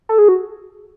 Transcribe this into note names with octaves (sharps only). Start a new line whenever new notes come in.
A4
G#4
F#4